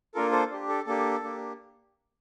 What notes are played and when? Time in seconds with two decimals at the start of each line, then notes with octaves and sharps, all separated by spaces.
0.15 A#3 D4 F4 A4 A#4
0.32 A4 C5
0.51 D4 G4
0.69 A4
0.87 A#3 D4 G4 A4
1.23 A#3 D4 G4